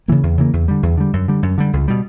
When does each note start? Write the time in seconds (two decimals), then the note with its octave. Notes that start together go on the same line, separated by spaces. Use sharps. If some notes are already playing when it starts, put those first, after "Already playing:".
0.08 C#3 E3 A#3
0.23 E2
0.38 C#3 E3 A#3
0.53 E2
0.68 D3 G3
0.83 E2
0.98 D3 G3
1.13 F#2
1.28 D3 G3
1.43 F#2
1.58 D3 G3
1.73 C#2
1.88 B2 G3